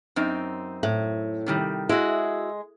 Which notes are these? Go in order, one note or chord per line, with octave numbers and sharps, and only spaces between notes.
F#2 C4 D#4
A2
C3 D#3 G3
G#3 E4 F#4